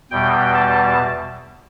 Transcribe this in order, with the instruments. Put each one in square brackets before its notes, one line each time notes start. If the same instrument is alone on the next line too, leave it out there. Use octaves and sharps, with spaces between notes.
[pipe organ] E2 B2 G3 G5
A5